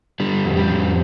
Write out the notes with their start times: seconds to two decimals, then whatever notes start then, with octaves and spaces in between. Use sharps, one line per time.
0.20 D3 G3
0.45 F2
0.57 G3
0.69 F2